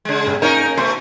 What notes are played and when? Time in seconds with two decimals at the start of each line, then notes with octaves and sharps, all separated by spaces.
0.05 C#3 G#3
0.27 B1 G2
0.42 A#3 C#4 D#4 A#4 C#5
0.77 B2 A3 C6